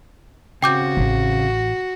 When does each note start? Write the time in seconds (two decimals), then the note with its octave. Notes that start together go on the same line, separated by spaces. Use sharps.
0.62 C#3 C4 F#4 G5 D6 G6
0.97 A1